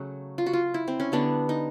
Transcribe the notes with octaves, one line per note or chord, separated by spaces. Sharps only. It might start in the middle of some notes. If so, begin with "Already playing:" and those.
Already playing: C#3 F#3 A3 F#4
F4
F#4
F4
E4
C4
C#4
D3 G3 B3 D4
D#4